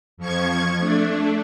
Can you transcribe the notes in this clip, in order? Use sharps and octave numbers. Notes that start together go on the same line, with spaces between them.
F2 F3 C#6 G#6
A3 D4